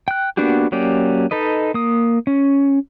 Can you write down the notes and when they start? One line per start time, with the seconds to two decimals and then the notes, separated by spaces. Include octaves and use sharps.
0.08 G5 F#6
0.37 A#3 B3 D4 F#4 G4
0.72 F#3 A#3 C#4 G4 D5
1.31 D#4 A4 B4 D#5
1.74 A#3 D#6
2.27 C#4